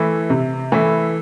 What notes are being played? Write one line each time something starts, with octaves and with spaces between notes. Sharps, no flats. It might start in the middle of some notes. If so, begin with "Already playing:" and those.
Already playing: E3 A3 E4
C3
E3 A3 E4